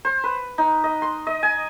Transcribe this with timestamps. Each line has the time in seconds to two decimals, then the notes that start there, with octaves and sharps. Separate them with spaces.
0.05 C5
0.24 B4
0.58 D#4
0.84 D#5
1.02 C6
1.27 D#5
1.43 G#5